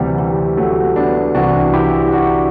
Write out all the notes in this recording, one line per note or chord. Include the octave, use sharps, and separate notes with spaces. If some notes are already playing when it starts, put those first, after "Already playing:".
Already playing: D2 C3 E3 G3
G3
F#3 A3
B3 D4
C2 C3 E3 D4 F#4
E4 G4
D4 F#4